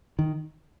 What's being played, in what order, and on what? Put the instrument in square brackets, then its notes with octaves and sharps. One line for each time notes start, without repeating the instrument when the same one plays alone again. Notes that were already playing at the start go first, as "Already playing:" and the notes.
[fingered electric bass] D#3